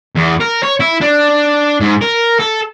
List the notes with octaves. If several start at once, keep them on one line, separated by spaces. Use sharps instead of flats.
E2
A#4
C#5
E4
D4
G#2
A#4
A4